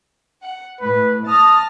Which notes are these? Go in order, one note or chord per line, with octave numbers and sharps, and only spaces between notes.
F#5
A2 B4
A5 D#6 F6 A#6